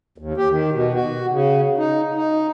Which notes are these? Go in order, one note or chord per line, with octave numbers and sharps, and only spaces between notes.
D#2
G4
D#3
B2
F#4
C#3
D#4
D#4